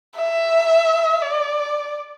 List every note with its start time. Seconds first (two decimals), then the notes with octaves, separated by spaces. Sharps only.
0.16 E5
1.22 D5